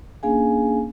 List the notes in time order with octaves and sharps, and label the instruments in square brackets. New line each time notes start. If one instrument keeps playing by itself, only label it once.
[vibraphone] A#3 C#4 D4 G#4 F5 G#5